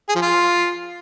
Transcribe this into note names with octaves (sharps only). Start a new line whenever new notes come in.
G#4
F3
F4